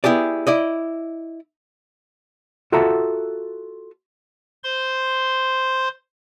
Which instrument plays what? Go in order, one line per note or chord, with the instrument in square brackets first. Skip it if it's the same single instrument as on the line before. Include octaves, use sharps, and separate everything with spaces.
[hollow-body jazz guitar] B3 E4 G4 G#4 D5
E4 D5 D#5
F4 F#4 A4 E5 F#5 A#5
[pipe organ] C5 C6